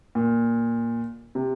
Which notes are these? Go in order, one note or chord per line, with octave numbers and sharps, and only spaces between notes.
A#2
C3